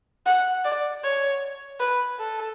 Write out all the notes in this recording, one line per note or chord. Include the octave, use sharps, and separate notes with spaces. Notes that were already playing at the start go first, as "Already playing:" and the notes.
F#5
D5
C#5
B4
A4